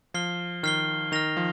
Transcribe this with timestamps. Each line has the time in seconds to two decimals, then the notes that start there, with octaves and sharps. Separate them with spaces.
0.14 F3 F6 C7 G7
0.63 D#3 F6 C7 G7
1.12 D#3 F6 A#6 F7
1.37 F3